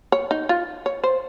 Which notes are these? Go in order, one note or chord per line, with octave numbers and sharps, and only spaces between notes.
C#5
D#4
F4
C#5
C5